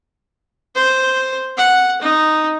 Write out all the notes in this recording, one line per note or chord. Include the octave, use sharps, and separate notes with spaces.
C5
F#5
D#4